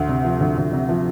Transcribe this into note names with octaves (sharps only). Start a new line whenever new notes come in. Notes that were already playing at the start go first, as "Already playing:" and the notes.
Already playing: D2
C3
F3
D2
D2
C3
F3